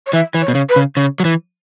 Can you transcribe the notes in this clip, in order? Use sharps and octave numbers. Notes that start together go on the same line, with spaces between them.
C#5
E3 E5
E3
C#5
B2
C#3
B4
C#3
C#3
F#3
E3